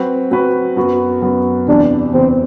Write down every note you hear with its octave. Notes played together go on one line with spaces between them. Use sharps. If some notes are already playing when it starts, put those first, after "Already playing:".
Already playing: F#3 C4 F#4 B4
F#3 C4 F#4 B4
F#2 F#3 B3 F#4
F#2 F#3 B3 F#4
E2 C3 E3 D4
E2 C3 E3 C4